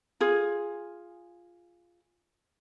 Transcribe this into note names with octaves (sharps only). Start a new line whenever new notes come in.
F4 G#4